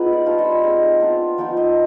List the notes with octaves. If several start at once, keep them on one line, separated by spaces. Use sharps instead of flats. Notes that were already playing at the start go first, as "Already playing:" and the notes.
Already playing: B3 D#4 F4 G#4 B4
D5
G3 D4 F4 F5
D#5
B5
G#5
G#3 C4 D#4
B3 D4 F4
F3 B3 D#4 G5
D#5